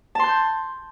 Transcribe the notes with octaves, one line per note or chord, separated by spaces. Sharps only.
A5 C6 G6